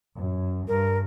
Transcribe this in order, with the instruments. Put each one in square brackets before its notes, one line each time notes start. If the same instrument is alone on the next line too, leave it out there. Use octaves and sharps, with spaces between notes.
[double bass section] F#2
[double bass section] G2 [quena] A#4